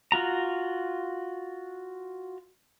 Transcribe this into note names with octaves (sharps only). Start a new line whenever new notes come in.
F4 F#4 A#5